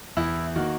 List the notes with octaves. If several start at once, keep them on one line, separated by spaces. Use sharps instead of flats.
E2 E4
D#3 A#3 F#4